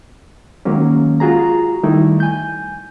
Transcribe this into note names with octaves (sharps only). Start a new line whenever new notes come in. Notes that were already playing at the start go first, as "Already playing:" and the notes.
D#3 F#3 G#3 A#3 C#4
F4 F#4 G#4 A#5
D#3 G3 A3 D#4 E4
G#5 G6